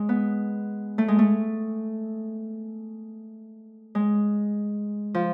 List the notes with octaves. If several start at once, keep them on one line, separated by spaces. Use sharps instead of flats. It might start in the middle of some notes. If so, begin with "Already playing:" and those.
Already playing: G#3
B3
A3
G#3
A3
G#3
F3